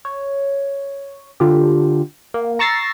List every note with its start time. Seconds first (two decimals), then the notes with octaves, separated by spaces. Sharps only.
0.05 C#5
1.40 D3 F4 G4
2.34 A#3
2.59 A#5 C#6 E6 A6 A#6 C7